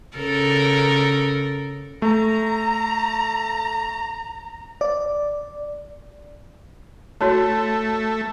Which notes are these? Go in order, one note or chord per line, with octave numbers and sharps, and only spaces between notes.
C#3 A4 A#4
A3 A#5
D5
A3 F#4 C#5 A5